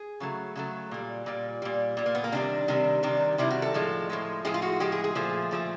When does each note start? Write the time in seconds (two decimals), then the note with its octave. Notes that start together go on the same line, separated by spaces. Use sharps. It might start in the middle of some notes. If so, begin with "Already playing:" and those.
Already playing: G#4
0.20 C#3 F#3 A3
0.56 C#3 F#3 A3
0.91 A#2 G3
1.26 A#2 G3
1.62 A#2 G3
1.97 A#2 G3
2.06 A#3
2.15 B3
2.24 A#3
2.32 C3 D#3 G3 D4
2.68 C3 D#3 G3
3.03 C3 D#3 G3
3.38 C3 D#3 G3 E4
3.50 F#4
3.62 A4
3.74 A2 F3 G#3
4.10 A2 F3 G#3
4.45 A2 F3 G#3 G#4
4.54 F4
4.62 F#4
4.80 A2 F3 G#3 G4
4.92 G#4
5.04 G#4
5.15 A#2 F3 A3
5.51 A#2 F3 A3